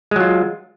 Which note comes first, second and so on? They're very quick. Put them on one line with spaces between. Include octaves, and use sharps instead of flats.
G#3 F#3 F4